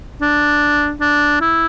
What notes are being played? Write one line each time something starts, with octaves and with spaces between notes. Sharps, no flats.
D4
D4
E4